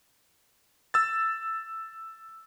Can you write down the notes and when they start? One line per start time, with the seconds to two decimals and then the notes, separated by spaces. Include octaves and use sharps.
0.94 E6 A6